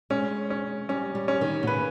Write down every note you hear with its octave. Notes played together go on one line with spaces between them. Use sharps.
G#3 C#4
C#4
G3 C#4
G3
C#4
D#3
B2
C#3 B4